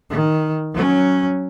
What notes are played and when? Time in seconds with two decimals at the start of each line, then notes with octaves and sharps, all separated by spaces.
0.10 D#3
0.73 F#3 C#4